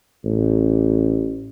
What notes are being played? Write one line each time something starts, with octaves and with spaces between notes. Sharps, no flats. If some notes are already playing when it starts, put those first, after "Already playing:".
A1